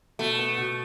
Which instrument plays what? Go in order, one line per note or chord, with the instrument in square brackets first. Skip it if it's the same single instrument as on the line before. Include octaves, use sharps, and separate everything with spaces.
[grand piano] B2 [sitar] A3
[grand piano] B3
B2